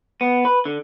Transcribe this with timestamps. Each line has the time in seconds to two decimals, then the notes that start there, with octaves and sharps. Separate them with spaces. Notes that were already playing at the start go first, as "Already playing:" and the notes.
0.21 B3
0.45 B4
0.65 D3